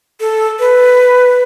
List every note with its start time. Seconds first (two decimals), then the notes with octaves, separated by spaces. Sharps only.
0.20 A4
0.59 B4